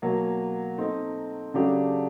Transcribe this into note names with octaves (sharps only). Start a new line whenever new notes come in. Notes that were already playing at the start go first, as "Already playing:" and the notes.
B2 F#3 A#3
A3 C4 D#4
C#3 F#3 A3 D4 G4